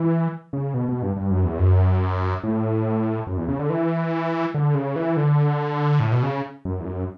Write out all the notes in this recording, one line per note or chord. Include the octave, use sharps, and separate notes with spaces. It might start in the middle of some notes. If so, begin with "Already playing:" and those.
Already playing: E3
C#3
B2
B2
G2
G2
F#2
E2
F#2
A2
F#2
E2
C#3
D3
E3
D3
C#3
E3
D3
A2
B2
C#3
F#2
E2
F#2